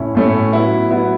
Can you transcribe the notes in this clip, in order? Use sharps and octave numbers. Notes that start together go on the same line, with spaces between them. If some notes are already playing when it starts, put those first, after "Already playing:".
Already playing: A2 A3 C#4 E4
A2 A3 C#4 E4
F#3 B3 E4
F#3 B3 E4